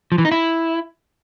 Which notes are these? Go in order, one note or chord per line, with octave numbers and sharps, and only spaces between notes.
F3
E3
D#4
E4